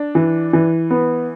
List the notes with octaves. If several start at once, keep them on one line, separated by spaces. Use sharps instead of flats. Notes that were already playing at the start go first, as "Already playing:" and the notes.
Already playing: D4
E3
E3
B3